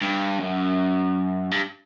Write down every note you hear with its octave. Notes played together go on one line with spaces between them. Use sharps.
G2
F#2
G2